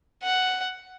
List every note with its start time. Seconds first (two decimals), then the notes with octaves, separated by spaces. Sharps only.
0.23 F#5